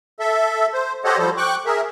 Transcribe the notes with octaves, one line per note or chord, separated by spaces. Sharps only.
A4 E5
C5
G4 A4 C5 C#5 D#5 F#5
F3 G3 A4 C5
G5 C#6 D6 F#6
G#4 A#4 E5